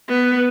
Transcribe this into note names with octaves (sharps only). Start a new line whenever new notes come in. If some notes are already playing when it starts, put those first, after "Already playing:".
B3